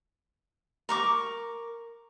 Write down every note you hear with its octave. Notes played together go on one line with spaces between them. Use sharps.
A#4 C#6 D6